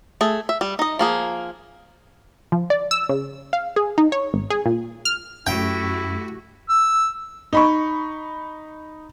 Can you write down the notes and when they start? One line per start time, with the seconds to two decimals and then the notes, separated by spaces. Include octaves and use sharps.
0.21 A3 G#4
0.49 E5
0.61 G3
0.79 D#4 D#5
0.99 F3 A#3 G#4
2.52 F3
2.70 D5
2.91 E6
3.09 C#3
3.53 F5
3.76 G#4
3.98 D#4
4.12 C#5
4.34 G#1
4.50 G#4
4.66 A#2
5.05 F6
5.47 F#2 A3 E4 F#4 G4 G5
6.69 E6
7.53 D#4 B5 C#6